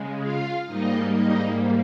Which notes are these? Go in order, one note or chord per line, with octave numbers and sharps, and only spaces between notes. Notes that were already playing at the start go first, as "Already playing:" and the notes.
Already playing: C#3 G#3
F4 F5
G#2 G3 A#3 D#4 D#5
D#4 D#5